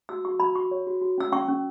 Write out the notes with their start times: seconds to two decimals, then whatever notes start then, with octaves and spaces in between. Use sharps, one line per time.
0.09 F#4 E6
0.25 F#4 C#6
0.40 F#4 B5
0.55 F#4 C#6
0.71 C#5
0.87 F#4
1.02 F#4
1.18 C#4 E6
1.32 C#4 C#6
1.48 C#4